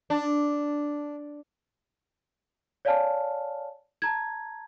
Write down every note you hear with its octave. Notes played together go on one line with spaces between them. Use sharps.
D4
C#5 D5 F5 G#5 A5 F6
A5 A#5 G#6